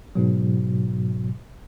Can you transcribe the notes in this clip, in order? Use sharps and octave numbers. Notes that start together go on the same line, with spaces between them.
G#2 B2 F#3